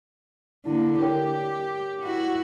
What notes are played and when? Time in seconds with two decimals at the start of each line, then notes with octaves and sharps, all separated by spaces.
0.66 D3 A#3 E4
1.01 G4 A#4 C#5 G5
2.03 E4 F#4